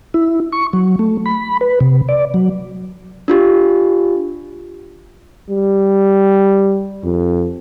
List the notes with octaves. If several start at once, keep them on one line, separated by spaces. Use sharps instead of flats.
E4
C#6
F#3
A3
B5
B4
C3
D5
F#3
D4 F4 G4
G3
F2